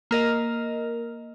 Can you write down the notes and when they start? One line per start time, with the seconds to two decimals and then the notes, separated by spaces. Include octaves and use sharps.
0.11 A#3 A#4 D#5